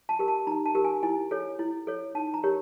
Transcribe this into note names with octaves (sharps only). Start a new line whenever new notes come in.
A5
G4 A#4
A5
D#4 A#5
A5
G4 A#4
G#5
E4 G#5
A4 C#5
E4
A4 C#5
D#4 A5
A#5
G4 A#4 C#5